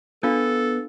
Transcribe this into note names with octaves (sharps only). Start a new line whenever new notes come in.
B3 D4 F4 A4 F5